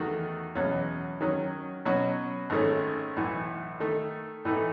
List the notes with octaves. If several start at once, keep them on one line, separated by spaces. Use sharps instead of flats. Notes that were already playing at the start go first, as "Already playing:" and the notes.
Already playing: E2 D#3 A3 D#4 F#4
E2 B2 F#3 C#4
D#3 F#3 C#4
B2 F#3 C#4 F#4
G#1 G#2 D#3 A3 C#4
B1 A2 E3
D#3 A3 D#4 A4
A2 E3 A3 D#4